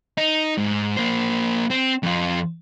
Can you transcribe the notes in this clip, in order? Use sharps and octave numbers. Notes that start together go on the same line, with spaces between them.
D#4
G#2
A#3 C5
C4
F2 F4